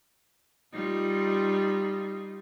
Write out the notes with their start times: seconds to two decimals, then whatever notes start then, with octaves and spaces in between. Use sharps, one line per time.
0.72 G3 D#4 F4